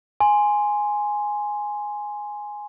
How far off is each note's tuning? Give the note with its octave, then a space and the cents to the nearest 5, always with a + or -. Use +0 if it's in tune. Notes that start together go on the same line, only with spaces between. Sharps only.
G#5 +0 C6 +0